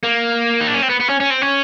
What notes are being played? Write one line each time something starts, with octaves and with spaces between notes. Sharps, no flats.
A#3
D#4
D4
C#4
C4
B3
B3
C#4
C#4
C4
C#4